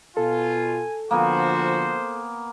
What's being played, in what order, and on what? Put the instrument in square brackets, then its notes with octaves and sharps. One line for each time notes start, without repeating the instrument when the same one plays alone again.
[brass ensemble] B2 F4 [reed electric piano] A4 [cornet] G#5
[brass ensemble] D3 F3 F#4 [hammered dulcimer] A#3 B3 G#5 [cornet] C5